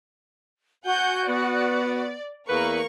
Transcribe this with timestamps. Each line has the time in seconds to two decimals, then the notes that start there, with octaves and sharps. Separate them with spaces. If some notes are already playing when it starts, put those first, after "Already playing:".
0.85 F#4 F#5 G#5 G6
1.27 B3 D5
2.48 E2 A#3 A#4 B4 A#5 C#6